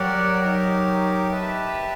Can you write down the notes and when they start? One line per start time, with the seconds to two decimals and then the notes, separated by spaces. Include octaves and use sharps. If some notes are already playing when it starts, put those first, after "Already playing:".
Already playing: F#3 G4 A#4 D5 F#5
0.41 D#4 G4 A#4
1.31 G4 B4 E5 A5